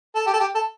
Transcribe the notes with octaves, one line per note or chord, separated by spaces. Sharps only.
A4
G4
A4
G4
A4